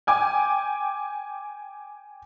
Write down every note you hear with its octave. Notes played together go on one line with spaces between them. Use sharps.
G5 G#5 D6